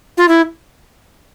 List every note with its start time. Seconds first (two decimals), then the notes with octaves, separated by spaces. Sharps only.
0.17 F4
0.28 E4